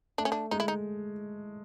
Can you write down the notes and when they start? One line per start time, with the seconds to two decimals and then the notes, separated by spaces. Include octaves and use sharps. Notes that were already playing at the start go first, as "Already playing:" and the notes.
0.18 A3 D4
0.25 C#4
0.32 D4
0.51 G#3 D#4
0.60 E4
0.68 D#4